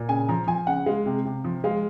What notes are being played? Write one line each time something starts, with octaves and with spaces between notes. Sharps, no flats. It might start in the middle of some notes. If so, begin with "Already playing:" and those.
Already playing: A#2
C#3 G#5
F3 A#5
F3 G#5
C#3 F#5
G#3 F5
C3
C3
F3
G#3 F5